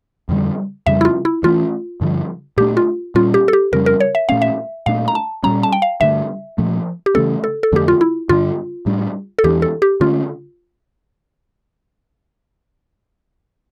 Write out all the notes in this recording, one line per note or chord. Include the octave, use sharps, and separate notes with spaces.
F2 D3 G3
F2 C#3 G3 E5
E4
F4
E4
G2 E3 A3 C#4 F4
G2 D3 F3
A#2 A3 D4 G4
F4
A#2 G3 C#4 F4
G4
A4
G4
F2 C#3 G3 C#4 A#4
A#4
C#5
E5
A#2 A3 C#4 F5
E5
A#2 A3 D4 F5
A#5
A5
A#2 G3 C#4 A#5
A5
G5
F5
G2 D3 A3 E5
A#2 F3 A3
G4
C#3 E3 A3 C#4 A4
A4
A4
F2 D3 A3 D4 G4
F4
E4
G2 D3 G3 D4 F4
A2 G3 D4
A4
E2 E3 A#3 D4 G4
A4
G4
D3 A3 C#4 F4